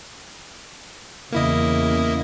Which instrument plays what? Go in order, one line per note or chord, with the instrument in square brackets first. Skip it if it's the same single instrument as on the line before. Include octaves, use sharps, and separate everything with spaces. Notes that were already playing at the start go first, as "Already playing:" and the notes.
[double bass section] E2 C#3 [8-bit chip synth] A#3 E4 D#5